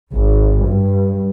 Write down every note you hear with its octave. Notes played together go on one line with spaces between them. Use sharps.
G#1
G2